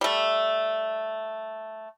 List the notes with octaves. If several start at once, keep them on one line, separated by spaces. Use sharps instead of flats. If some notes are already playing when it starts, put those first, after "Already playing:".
G3 A3